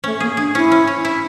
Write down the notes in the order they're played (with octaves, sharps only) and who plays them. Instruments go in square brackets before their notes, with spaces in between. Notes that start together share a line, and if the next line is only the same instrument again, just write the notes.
[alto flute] A3 [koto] C#4
[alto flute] A#3 [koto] G#4
[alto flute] D4 [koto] G#4
[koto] C#4 [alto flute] E4
[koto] C#4
C#4
E4